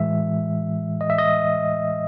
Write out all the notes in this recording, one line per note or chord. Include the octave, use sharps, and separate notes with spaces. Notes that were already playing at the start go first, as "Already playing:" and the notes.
Already playing: A2 E3 G#3 E5
D#5
E5
D#5